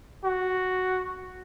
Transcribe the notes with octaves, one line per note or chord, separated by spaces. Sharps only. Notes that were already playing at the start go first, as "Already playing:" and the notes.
F#4